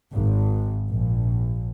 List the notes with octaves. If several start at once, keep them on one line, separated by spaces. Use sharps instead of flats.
G#1
A#1